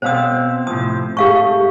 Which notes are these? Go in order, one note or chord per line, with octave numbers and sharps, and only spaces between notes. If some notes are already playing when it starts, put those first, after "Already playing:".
B2 C4 C5 F5 D#6
A2 C3 F3 D#6
G#2 A3 G4 F5 C#6